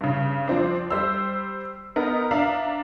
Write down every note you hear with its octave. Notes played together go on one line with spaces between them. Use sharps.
G2 C#3
F3 C4 D4
G3 C5 E6
B3 D#4 A#4
D4 E5 F5 A#5